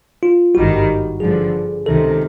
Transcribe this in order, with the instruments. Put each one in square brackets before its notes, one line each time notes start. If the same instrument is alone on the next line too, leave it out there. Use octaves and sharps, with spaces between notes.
[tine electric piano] F4
[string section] G#1 G2 D#3 G3 [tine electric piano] F#4
[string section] G2 D3 F3 [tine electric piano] G#4
[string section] C#2 C3 D#3 [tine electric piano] A4